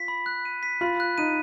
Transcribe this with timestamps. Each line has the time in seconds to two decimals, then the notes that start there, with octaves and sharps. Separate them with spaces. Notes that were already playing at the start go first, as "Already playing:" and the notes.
Already playing: F4 B6
0.08 B5
0.26 F#6
0.45 D#7
0.63 B6
0.81 F4 B5
1.00 F#6
1.18 D#4 D#7